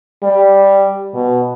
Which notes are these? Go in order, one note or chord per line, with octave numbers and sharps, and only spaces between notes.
G3
B2